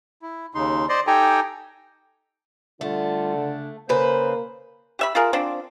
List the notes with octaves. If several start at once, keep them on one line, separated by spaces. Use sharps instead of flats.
E4
D#2 C#3 D#4 C6
C5 D5 D#5 C6
D#4 G4 A4 G5 G#5 A#5
D3 G3 A3 F4
C#3 D4
C#3 A#3 B4 C5
G4 E5 B5
F4 G#4 A#4
F3 C4 D4